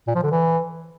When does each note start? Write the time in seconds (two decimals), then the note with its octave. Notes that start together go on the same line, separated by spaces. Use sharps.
0.07 A#2
0.15 F3
0.23 D3
0.31 E3